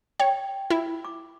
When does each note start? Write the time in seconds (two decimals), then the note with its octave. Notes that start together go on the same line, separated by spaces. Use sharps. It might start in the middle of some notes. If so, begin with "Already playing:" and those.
0.20 C#5 G5
0.70 E4
1.05 D6